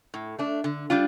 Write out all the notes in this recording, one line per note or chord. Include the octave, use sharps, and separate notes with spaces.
A2
A3 D4
D3
G3 D4 F4